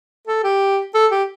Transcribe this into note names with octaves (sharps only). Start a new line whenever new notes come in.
A4
G4
A4
G4